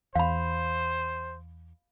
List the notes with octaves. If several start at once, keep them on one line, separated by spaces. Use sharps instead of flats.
E2 C5 F5 B5